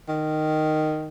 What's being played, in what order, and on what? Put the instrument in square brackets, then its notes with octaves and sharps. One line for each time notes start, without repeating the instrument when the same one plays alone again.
[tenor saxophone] D#3